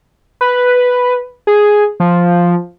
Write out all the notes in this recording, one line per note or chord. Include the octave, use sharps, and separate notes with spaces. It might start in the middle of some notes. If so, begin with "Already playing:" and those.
B4
G#4
F3